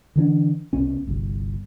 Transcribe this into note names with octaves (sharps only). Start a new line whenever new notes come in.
D3 E3 C#4 D4
C2 B2 C#4
G1 C2